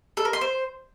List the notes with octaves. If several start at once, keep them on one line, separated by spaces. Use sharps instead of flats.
A4
A#4
C6
C5